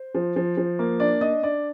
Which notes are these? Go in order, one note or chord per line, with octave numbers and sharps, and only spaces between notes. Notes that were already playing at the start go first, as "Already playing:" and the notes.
Already playing: C5
F3
F3
F3
A#3
D4 D5
D4 D#5
D4 D5